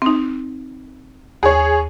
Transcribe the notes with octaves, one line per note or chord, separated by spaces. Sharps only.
C4 D#4
D#2 G#4 C#5